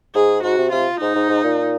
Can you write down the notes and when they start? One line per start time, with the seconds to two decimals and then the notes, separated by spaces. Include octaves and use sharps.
0.15 G#2 G#4
0.44 G#2 F#4
0.58 C3
0.72 C3 F4
1.01 G#2 D#4
1.16 G#2
1.29 G#2
1.43 A#2